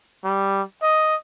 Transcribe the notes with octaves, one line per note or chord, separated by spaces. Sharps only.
G3
D#5